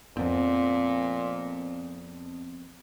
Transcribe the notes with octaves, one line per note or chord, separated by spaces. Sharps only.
F2 A#2 F3 B3 C4